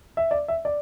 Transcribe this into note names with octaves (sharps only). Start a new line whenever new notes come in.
E5
D5
E5
D5